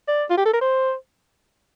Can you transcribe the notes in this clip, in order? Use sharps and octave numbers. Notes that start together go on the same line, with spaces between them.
D5
F4
G4
A4
A#4
C5